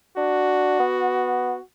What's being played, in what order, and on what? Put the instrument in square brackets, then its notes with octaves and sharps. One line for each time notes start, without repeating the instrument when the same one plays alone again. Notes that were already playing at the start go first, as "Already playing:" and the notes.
[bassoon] D4 [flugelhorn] F#4
[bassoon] B3